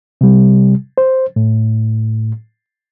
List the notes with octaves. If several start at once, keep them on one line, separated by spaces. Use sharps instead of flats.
C3 G3
C5
A2